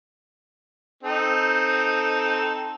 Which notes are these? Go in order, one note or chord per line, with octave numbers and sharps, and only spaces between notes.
C4 D#4 A4